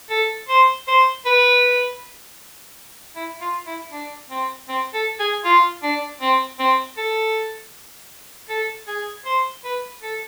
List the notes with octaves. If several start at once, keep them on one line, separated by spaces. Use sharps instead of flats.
A4
C5
C5
B4
E4
F4
E4
D4
C4
C4
A4
G#4
F4
D4
C4
C4
A4
A4
G#4
C5
B4
A4